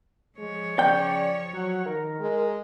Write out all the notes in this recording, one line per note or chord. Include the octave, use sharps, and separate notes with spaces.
F3 G#3 C#5
C#3 D5 G5
F#3 F#5
D#3 A#4
G#3